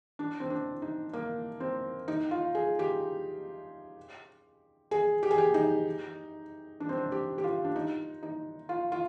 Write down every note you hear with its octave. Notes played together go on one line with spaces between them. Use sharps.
D4
C4
D4
D#4
A#3
C4
D#4
F4
G#4
G4
G#4
G4
G#4
G4
D#4
D4
C4
D4
G4
G4
F4
D4
D#4
D#4
F4
F4